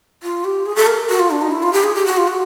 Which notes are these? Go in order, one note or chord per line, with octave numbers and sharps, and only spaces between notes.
F4
G4
G#4
A4
A#4
F#4
F4
D4
D#4
E4
F4
G4
G#4
G4
F#4
F4
F#4